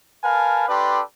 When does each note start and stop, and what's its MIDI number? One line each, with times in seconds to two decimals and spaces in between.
0.23 0.63 70
0.23 0.63 71
0.23 0.63 77
0.23 0.63 80
0.23 0.63 81
0.68 1.00 62
0.68 1.00 67
0.68 1.00 69
0.68 1.00 71
0.68 1.00 74
0.68 1.00 84